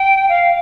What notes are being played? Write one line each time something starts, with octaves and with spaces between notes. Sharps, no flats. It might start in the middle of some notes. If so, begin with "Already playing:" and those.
Already playing: G5
F5